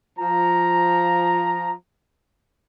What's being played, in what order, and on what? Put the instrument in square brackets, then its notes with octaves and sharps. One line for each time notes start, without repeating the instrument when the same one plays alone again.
[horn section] F3 A#5